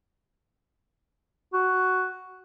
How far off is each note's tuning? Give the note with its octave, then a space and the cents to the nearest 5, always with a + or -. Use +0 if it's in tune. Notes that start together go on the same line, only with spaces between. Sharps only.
F#4 +5